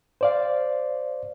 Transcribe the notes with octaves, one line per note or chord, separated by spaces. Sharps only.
C5 D5 F5